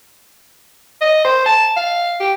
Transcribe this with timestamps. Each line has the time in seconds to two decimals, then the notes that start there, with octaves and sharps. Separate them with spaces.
1.01 D#5
1.25 C5
1.46 A5
1.76 F5
2.20 G4